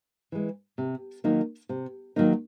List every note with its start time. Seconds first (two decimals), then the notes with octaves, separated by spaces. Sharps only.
0.32 E3 G#3
0.78 C3
1.24 D#3 F#3 A#3 D#4
1.69 C3
2.16 D#3 F#3 A#3 D#4